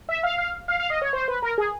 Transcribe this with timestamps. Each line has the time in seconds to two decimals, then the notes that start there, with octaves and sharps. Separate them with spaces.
0.09 E5
0.23 F5
0.38 F5
0.68 F5
0.80 F5
0.90 D#5
1.02 C#5
1.13 C5
1.28 B4
1.42 A#4
1.58 G#4